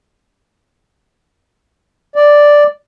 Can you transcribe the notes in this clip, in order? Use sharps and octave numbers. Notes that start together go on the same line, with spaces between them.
D5